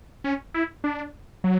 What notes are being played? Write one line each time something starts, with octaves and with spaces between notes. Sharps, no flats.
C#4
E4
D4
F#3